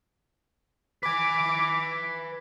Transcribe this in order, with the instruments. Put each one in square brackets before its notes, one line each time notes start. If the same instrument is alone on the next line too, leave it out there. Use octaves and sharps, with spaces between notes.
[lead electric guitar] B4 G#5 [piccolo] D6